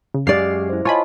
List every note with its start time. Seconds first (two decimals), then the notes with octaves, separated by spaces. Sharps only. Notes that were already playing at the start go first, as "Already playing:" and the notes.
0.14 C#3
0.27 F#2 G#3 G4 D5 F5 D6 C7
0.69 E4 C5
0.85 F4 C#5 D#5 G#5 A5 B5 C#6